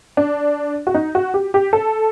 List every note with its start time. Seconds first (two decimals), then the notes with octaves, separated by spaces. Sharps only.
0.17 D4
0.87 F#4
0.94 D#4
1.15 F#4
1.34 G4
1.54 G4
1.73 A4